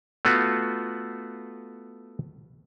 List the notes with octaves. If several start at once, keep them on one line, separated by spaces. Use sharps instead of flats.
A3 B3 F4 F#4